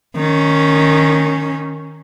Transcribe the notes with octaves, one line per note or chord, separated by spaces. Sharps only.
D#3 C#4